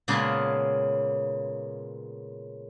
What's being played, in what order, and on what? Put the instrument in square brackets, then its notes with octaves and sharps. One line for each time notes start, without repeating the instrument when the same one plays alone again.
[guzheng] A#2 C#3 G#3 A#3 B3 A5